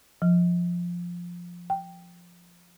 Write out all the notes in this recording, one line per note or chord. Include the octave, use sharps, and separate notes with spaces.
F3
G5